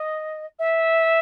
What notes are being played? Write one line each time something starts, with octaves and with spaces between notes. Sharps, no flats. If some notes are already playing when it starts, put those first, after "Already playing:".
Already playing: D#5
E5